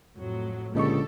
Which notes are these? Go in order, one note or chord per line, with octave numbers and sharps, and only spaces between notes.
F2 A2 F#3
C#2 A#2 D3 G4 A4 D#5 C#6